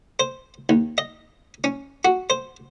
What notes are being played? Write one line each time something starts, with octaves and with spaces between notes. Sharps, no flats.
C5
D#2
D#5
C#4
F#4
C5